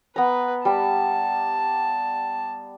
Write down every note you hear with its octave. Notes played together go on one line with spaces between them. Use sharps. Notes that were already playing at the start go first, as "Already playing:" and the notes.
B3 B4 A#5
G3 A5 B5